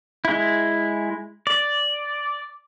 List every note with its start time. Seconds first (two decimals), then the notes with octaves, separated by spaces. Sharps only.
0.25 G#3 E4
1.47 D5